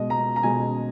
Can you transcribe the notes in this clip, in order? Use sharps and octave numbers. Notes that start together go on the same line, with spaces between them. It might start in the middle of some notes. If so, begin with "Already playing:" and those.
Already playing: B2 G#3 D#5
A#5
A#5
B2 G#3 G#5